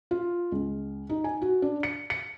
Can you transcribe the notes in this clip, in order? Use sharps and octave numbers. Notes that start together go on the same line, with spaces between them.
F4
C#2
D#4
G#5
F#4
D4
C#7
C#7